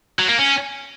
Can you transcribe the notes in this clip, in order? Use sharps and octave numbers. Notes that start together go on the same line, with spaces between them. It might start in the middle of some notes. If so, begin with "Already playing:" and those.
F#3
A#3
C#4